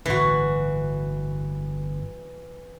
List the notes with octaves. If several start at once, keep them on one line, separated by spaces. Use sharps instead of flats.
G1 A2 E3 F#4